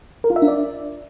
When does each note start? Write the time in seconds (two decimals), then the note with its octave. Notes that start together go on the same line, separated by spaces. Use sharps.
0.24 A#4
0.30 F4
0.36 E5
0.42 D4
0.48 D5